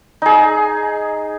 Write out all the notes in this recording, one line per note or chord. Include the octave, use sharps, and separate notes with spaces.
D#4 G#4